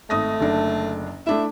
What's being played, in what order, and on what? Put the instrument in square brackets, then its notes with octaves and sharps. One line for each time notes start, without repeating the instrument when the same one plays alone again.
[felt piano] G#1 D#6 A#6 [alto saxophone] A3
[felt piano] F#1 D3 D4
[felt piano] A3 D4 E4 [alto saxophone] E5